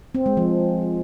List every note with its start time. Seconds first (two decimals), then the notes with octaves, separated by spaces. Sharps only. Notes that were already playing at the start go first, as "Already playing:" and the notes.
0.15 C4
0.26 G#3
0.37 F3